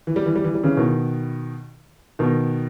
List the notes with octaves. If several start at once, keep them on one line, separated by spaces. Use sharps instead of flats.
E3
G3
E3
G3
E3
G3
C#3 E3
B2 D#3
B2 D#3